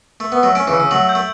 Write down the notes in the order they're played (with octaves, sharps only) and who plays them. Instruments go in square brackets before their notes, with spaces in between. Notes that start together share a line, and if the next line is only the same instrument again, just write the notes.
[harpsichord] A3 [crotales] E6
[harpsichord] B3
[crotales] E6
[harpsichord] F#3 A3
[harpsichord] A3 C#4 [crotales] D7
[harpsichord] C#3 E3
[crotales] E6
[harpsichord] C#3
[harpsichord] F#3 A3 [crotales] F#7
[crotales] G6
[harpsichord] A3